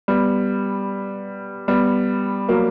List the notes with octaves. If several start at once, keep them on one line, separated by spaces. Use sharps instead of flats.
G3 B3
G3 B3
F#3 A#3